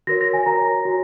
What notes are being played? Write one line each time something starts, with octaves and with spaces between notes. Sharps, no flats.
F#4 A#4 C#5 A#6
A#6
G#5
F#4 A#4 C#5 A#5
F#4 C#5